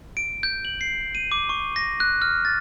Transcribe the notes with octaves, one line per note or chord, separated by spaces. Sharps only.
D7
G6
F#7
C7
D#7
D6
C#6
A#6
F#6
F6
A6